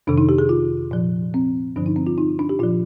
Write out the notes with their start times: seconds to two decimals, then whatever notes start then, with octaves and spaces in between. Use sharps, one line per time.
0.07 F2 C3 D#3 D4
0.18 D#4
0.29 G4
0.38 G#4
0.49 F4
0.91 A#2 F3
1.34 C4
1.76 G2 D3 F3 D4
1.86 D#4
1.96 C4
2.07 F4
2.18 D#4
2.39 D4
2.49 G4
2.59 A#2 F3 F4